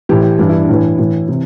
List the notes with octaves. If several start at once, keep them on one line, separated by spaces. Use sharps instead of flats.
A2 E3 G4
G2 E3 D4
E4
D4
A2 E3
A2 E3
C3 E3